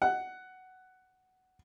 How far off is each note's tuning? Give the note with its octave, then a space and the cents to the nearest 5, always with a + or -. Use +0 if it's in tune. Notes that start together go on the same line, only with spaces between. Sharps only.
F#5 +10